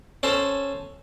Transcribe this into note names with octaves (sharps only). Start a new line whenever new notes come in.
C#4 A4 C5